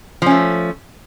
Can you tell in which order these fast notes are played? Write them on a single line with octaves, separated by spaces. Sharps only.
F3 C#4 A3